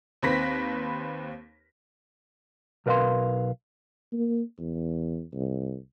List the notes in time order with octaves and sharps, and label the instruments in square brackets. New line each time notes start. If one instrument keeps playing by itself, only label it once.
[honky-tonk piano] D#2 C4 B4 B5 A#6 B6
[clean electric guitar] B1 A#4 B4 E5 F5 C6
[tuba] A#3
E2
C2